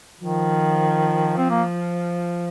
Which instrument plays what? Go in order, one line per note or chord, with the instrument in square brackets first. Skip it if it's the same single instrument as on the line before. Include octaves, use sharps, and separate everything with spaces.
[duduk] D#3 [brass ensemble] F3
[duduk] C4
A#3